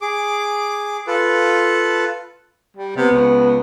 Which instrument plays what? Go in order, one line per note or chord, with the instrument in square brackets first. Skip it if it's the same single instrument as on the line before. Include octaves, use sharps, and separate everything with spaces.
[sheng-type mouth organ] G#4 D6
F4 A4 B4
[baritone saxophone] G3
[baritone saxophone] C3 [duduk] B3
[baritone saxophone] C#2